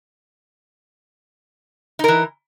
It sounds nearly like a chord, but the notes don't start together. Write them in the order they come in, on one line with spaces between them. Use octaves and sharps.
D#4 A#4 E3